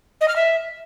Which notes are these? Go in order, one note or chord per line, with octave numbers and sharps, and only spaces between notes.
D#5
F6
E5